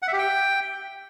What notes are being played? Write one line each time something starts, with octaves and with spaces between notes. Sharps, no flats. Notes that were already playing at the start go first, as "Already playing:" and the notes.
F#5
E5
G4
G5